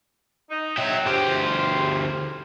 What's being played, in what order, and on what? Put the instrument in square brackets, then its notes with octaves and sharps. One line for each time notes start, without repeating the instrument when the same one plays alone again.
[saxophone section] D#4
[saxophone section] F#3 [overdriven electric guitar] E5 G5
[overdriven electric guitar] D2 G4 [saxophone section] F4 C5